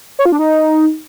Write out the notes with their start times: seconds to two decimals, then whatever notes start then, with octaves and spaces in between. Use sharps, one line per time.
0.19 C#5
0.26 F4
0.32 D4
0.39 D#4